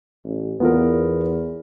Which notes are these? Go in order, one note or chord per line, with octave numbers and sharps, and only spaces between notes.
A1
E2 B3 F4 A#4